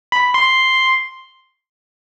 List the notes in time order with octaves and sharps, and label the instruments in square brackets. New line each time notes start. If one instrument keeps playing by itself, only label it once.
[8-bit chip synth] B5
C6